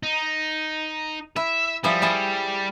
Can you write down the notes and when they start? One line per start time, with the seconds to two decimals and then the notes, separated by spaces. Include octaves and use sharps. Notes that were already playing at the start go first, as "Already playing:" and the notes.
0.03 D#4
1.36 E4 E5
1.84 F3 G3 E4 G#4
2.02 E4 G#4 A4